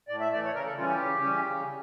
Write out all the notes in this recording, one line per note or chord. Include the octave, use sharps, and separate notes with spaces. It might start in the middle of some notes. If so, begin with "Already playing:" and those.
A2 D5
E5
E3 A3 D5
C#5
C#3 A#4
A4
E3 G3 C#4 F4
G4
C#3
E3 G3 C#4
C#3